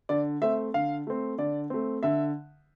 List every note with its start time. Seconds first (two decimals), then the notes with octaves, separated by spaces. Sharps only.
0.09 D3 D5
0.42 A3 C4 E5
0.74 D3 F5
1.07 A3 C4
1.38 D3 D5
1.70 A3 C4
2.03 D3 E5